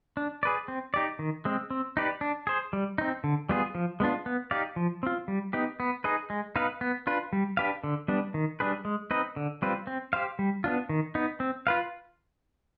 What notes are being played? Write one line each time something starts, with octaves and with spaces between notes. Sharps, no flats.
D4
G#4 B4 D5
C4
D#4 G4 D5
D#3
G#3 C4
C4
D#4 G4 B4 D5
D4
G#4 C5
G3
C4 D#4
D3
G3 B3 F4 G#4
F3
G#3 B3 D4 F4
B3
D#4 G4 D5 F5
F3
C4 F4
G3
B3 D#4 G4
B3
D#4 G#4 B4 D#5
G#3
B3 D#4 B4 F5
B3
D4 F4 B4
G3
D4 G4 B4 F5
D3
G3 B3 D4
D#3
G3 D4 G#4 B4
G#3
C4 D#4 B4 D#5
D3
G3 C4 F4 B4
C4
G4 C5 F5
G3
B3 D4 F4
D#3
B3 D#4
C4
F4 B4 F5